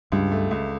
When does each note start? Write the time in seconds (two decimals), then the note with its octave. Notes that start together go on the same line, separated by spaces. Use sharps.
0.12 C#2 G2
0.32 A3
0.51 C#2